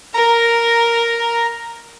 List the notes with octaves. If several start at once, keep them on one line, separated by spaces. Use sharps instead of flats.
A#4 A#5